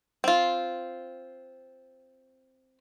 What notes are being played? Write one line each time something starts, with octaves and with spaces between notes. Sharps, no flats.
C4 F4